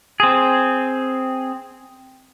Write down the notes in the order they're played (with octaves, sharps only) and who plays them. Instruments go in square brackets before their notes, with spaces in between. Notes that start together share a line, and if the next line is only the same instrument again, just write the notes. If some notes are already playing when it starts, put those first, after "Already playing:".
[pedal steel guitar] C4 G#4